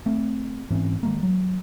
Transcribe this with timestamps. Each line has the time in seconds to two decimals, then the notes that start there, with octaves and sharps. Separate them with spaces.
0.06 A3 C4
0.70 G#2 E3 C4 C#4
1.03 D#3 G#3 A#3
1.23 F#3